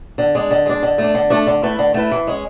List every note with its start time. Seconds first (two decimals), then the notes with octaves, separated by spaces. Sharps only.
0.18 D3
0.35 G#3 D4
0.51 D3
0.66 G#3 D4
0.83 D3
0.98 A3 D4
1.14 D3
1.30 A3 D4
1.47 D3
1.63 A3 E4 B4
1.79 D3
1.94 A3 E4 B4
2.11 E3
2.27 G#3 C#4 G#4